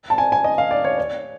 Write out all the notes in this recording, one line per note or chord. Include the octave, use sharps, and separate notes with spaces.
A5
G#5
G#5
D#5
F5
D5
C#5
C#5